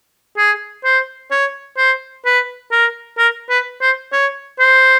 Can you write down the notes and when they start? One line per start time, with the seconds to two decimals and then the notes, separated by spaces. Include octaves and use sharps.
0.37 G#4
0.84 C5
1.31 C#5
1.77 C5
2.25 B4
2.72 A#4
3.18 A#4
3.50 B4
3.81 C5
4.12 C#5
4.59 C5